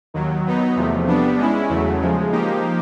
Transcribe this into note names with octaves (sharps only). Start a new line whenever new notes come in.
D#2 D#3 F#3
F#3 B3 D#4
E2 C3 F3 A3
G3 B3 D4
G#3 C#4 E4
E2 C#3 F#3 A3
C#3 F3 G#3
F3 A#3 D#4 G4